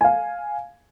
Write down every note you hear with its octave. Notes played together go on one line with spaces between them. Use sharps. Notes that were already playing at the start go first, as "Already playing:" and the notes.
F5 G#5